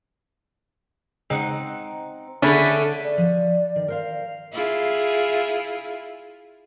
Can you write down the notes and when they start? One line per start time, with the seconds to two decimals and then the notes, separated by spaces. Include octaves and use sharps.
1.30 C#3 G#3 C4 D#4 F#5
2.43 D3 A3 C#4 D4 E4 G#4 F#5 B5
3.04 D5
3.18 F3
3.76 D#3
3.88 A#4 C5 F5
4.53 E4 F4 G#4